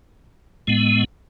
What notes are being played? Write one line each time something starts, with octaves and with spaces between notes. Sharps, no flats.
A2 G#3 B3